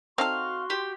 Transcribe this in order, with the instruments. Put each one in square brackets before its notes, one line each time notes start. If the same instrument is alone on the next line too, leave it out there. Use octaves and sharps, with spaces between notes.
[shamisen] C4 D#4 A4 [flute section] F#4 C6 C#6 [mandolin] F5
[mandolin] G4